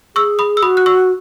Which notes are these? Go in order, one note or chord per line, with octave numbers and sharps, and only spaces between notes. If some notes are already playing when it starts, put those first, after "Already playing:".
G#4 C#6 E6
B5 D#6
E6
F#4 B5 D#6
F#6
C#6 E6